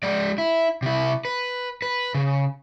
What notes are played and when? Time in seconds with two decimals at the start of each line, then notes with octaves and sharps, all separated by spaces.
0.03 G#3 D5
0.38 E4
0.82 C3 E4
1.25 B4
1.82 B4
2.14 C#3